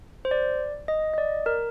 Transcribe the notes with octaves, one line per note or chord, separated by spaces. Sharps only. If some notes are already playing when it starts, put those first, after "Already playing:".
C5
D5
D#5
D#5
D5
A#4